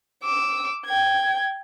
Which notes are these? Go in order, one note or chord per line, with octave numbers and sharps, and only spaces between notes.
D6 E6
G5 G#6